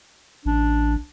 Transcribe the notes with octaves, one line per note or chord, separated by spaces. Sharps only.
A1 D4